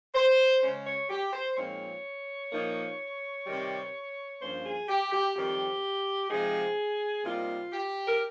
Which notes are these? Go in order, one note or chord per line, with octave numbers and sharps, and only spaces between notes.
C5
C#3 G#3 C#4
C#5
G4
C5
A#2 F3 G#3 C4 D#4 C#5
A#2 F3 A#3 D#4
C3 D#3 G3
G2 F3 A#3 C#4 C5
G#4
G4
G4
F2 D#3 G3 C4 G4
C3 F3 G#3 D#4 G#4
C3 G3 A#3 D#4 F4
G4
A#4